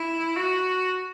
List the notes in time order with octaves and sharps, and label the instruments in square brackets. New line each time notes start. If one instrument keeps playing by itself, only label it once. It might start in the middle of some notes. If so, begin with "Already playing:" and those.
Already playing: [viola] E4
F#4